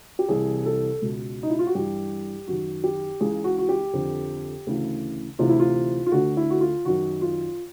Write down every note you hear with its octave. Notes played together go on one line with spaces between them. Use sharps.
G4
C2 C3 E3 G#4
A4
C#2 B2
D#4
E4
F4
F#4
G2 E3 G4
F#2 D#3 F#4
G4
C#2 C#3 E3 G#4
F#4
F#4
G4
F2 D3
D2 C#3 E3
D2 C3 E3 F4
E4
F4
F4
D2 D3 F#4
E4
F#4
F4
F#2 D#3 F#4
F4